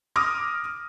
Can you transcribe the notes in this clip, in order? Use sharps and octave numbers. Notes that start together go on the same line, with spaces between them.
D6 D#6 F6 A#6